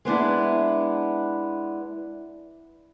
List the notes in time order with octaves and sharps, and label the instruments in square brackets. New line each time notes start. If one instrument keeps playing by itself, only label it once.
[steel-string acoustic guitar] G#3 B3 D4 E4